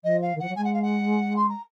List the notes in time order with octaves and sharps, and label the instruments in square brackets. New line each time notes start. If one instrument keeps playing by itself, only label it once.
[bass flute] F3 [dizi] D#5
[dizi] F5
[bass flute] D#3
[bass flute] F3 [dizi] F#5
[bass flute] F#3
[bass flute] G#3 [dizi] G#5
[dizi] F#5
F5
F#5
C6
A#5